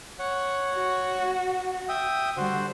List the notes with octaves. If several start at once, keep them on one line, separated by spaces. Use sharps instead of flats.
C#5 F#5
F#4
E5 G5 D#6
D3 G3 F#4 C5